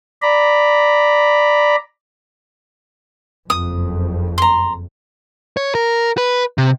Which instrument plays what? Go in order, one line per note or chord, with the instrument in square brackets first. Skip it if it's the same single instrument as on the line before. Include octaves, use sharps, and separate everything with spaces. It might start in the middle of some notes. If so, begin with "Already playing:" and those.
[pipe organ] D5 A#5 B5
[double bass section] F#1 F2 [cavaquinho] D#6
[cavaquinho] A#5 C6
[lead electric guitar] C#5
A#4
B4
C3